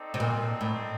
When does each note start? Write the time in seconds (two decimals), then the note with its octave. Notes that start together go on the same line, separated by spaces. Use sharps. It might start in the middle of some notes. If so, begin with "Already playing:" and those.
Already playing: C4 D#4 A4 D5
0.14 C3
0.20 A#2
0.61 A2